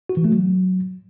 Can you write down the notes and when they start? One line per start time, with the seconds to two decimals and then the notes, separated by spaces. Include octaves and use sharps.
0.09 F#4
0.17 E3
0.24 A3
0.32 F#3